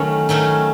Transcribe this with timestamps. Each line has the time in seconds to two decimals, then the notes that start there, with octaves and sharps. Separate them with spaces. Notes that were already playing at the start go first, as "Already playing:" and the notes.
Already playing: D#3 F#3 A3 C#4 C#5
0.29 D#3 F#3 A3 C#4